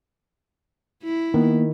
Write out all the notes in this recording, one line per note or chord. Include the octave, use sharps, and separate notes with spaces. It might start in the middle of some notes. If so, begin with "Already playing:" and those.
E4
D#3 A#3 B3